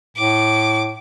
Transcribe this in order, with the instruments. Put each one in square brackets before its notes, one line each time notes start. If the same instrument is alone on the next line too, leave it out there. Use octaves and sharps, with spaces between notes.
[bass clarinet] A2 [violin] D6